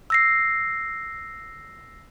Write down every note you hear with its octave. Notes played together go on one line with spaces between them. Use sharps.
E6 A#6 C7